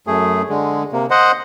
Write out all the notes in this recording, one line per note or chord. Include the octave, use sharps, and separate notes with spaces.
F#2 A3 G#4
D3 G#3
C3 A#3
C5 D#5 F#5